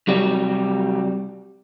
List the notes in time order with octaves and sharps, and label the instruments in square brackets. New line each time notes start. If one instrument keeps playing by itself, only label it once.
[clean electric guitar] C3 F#3 G3